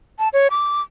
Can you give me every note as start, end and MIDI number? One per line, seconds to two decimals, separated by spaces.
0.19 0.29 81
0.33 0.48 73
0.51 0.81 86